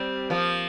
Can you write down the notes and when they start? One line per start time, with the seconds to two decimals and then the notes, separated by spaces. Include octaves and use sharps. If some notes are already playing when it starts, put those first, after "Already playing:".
Already playing: G3 C4
0.30 F3 A#3